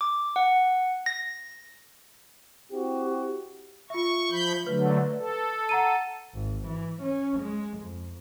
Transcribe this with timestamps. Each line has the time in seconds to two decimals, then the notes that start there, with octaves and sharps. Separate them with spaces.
0.01 D6
0.36 F#5
1.06 A#6
2.72 C4 E4 F#4 G4
3.90 F4 E5 C#6
4.31 F3 B5 G6
4.67 D3 F#3 A3 B4
5.17 A4
5.69 F#5 A#5 D#7
6.34 G#1
6.68 E3
7.03 C#4
7.40 G#3
7.79 F2